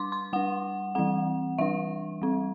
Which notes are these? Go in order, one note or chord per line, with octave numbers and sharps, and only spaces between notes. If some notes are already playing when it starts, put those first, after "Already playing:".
Already playing: G3 D4 C6 D6
C6
G3 D4 F#5
E3 G3 C4 F#5
E3 G3 D4 E5
G3 C4